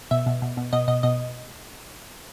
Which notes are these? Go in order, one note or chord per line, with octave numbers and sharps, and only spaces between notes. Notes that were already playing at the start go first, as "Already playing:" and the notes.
B2 E5
B2
B2
B2
B2 D#5
B2 D#5
B2 D#5